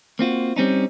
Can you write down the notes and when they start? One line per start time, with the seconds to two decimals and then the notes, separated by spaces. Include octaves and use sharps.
0.19 A#3 C4 F4 F#4
0.56 G3 C4 C#4 D#4